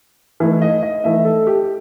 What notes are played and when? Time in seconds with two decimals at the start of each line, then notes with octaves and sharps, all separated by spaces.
0.40 E3 A3 D#4
0.62 D#5
0.83 D#5
1.03 E3 A3 D#4 E5
1.25 A4
1.47 G4